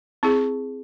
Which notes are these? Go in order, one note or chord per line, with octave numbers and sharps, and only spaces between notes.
C4 E4 G#4